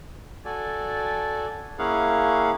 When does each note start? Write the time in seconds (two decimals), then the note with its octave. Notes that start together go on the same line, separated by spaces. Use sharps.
0.45 F#4 A4 D5 G#5
1.78 A#3 C#4 E4 G#4 F5 F#5